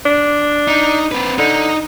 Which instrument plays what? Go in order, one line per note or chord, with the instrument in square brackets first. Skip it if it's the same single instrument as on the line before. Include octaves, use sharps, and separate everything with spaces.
[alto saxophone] D4
[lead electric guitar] D#4
C4 B4
[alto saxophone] D3 [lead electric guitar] D#4